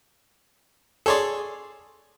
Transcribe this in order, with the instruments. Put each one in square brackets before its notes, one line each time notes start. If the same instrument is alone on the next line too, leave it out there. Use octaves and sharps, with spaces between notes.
[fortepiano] G#4 C6 [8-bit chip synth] A4 C#5 D5